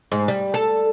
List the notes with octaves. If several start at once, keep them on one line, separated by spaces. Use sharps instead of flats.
G#2
G3
A4